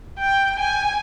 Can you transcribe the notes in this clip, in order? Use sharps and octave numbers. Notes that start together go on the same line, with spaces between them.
G5
G#5